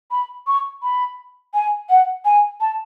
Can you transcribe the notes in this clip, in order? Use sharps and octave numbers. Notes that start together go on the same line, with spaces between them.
B5
C#6
B5
G#5
F#5
G#5
A5